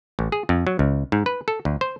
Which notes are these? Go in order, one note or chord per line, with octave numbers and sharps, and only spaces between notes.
A1
G#4
F2
F#3
C#2
G#2
B4
A4
D2
C5